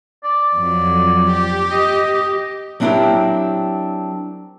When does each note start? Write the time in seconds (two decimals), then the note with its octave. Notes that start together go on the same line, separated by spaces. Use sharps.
0.24 D5
0.55 F2 F#3
1.32 G4
1.72 D#5
2.80 F#3 C4 D4 E4 G4 A#4